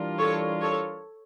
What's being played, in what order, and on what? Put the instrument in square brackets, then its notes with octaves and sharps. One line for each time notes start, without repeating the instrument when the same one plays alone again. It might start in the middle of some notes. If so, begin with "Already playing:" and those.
Already playing: [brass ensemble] E3 G3 D4 F4 A#4
[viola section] A4 C#5
A4 C#5